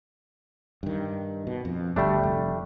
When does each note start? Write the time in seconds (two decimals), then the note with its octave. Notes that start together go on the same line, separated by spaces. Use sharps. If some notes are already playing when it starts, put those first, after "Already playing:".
0.83 G2 D#3
1.47 B2
1.65 F2
1.96 G1 D2 G3 A3 D4
2.23 F1